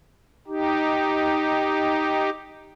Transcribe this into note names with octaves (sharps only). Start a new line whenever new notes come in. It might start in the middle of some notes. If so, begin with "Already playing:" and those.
D#4 G4